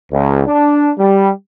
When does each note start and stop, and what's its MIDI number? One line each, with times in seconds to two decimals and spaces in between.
0.11 0.42 37
0.46 0.90 62
0.98 1.29 55